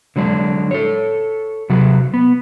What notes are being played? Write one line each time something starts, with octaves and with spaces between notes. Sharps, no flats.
D3 F#3 G#3 D4
A4 C#5
C3 F#3 F#4
B3